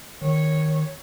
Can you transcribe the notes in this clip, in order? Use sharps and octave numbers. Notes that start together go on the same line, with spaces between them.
D#3 C#5